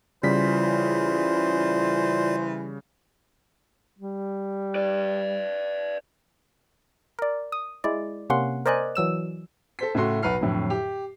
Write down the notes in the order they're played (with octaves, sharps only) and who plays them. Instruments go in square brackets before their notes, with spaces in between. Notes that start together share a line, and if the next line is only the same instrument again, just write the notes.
[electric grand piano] C#3 G3 B6 [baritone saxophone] E3 [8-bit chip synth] F4 D5 [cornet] C5
[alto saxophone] G3
[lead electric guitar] B4 D5
[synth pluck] A#4 D5
D#6
G#3 E4 D5
C3 A#3 C#4 F#5 C6
A#4 C5 D5 D#5 G#5 F#6
E3 F#3 E6 E7
[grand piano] A4 C5 B6
A2 C#3 A3 F#4 C6
B1 B4 F#5 F6 C7
F2 A2 D3 F#3
G4